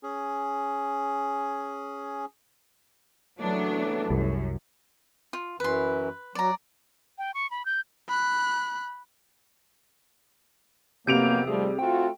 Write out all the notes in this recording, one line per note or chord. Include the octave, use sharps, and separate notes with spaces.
C#4 G#4
F#1 E3 F#3 A3 B3 D4
C2 F#2
F4
F#2 E3 B4 C6
F#3 D5 A#5
G5
C#6
B5
G6
B5 F#6
F2 C3 F#3 A#3 B3 G6 D7 F7
D#2 F3 G3 A3 G#4
A3 C4 F4 F#4 G5